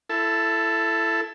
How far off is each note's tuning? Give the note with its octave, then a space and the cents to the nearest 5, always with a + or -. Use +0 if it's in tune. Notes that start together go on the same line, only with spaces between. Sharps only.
E4 +20 A4 +0